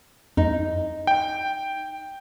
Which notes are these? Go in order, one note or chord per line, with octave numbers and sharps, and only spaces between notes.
F2 D#4
G5